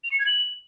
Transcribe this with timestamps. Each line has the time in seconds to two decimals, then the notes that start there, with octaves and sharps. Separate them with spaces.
0.04 F7
0.11 C#7
0.19 G#6
0.27 F#7